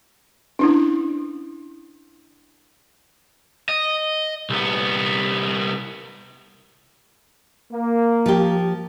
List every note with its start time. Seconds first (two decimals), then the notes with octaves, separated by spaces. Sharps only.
0.59 C#4 D4 E4
3.69 D#5
4.50 C2 B3
7.72 A#3
8.26 F3 G4